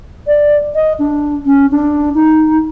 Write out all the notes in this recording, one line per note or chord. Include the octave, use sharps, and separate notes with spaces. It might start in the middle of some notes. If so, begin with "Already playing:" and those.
D5
D#5
D4
C#4
D4
D#4